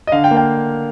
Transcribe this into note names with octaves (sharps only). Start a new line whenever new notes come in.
D#5
D3 F5
G5
A#3
G5